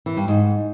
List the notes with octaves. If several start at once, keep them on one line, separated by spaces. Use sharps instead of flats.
E3
G2
G#2